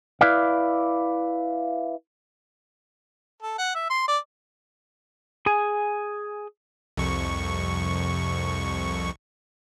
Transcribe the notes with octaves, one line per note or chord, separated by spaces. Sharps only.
E4 B4 D5 F5
A4
F#5
E5
C6
D5
G#4 G#5
C2 F2 C#6